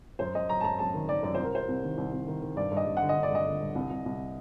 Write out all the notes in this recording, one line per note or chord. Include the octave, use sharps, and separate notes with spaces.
F#2 C5
F#2 D#5
F#2 A#5
A5
F#2 A#5
F#2 A5
D#3
D#3 D5
F#2 D5
C2 C5
A#4
C3 C5
C2
D#3
C2
C2
D#3
D#3
G2 D5
G2
D#5
G2
D3 F#5
D#5
D3
D5
G2 D#5
D3
G2
C2
C2
C2